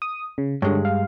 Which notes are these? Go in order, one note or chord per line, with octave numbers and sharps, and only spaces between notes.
D#6
C#3
G2 D3 G#3 C#5
F5